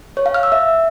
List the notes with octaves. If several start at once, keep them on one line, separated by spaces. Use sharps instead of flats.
C#5
F5
F6
E6
E5